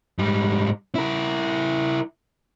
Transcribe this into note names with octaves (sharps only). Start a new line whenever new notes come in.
G#2 G3
E4 A#4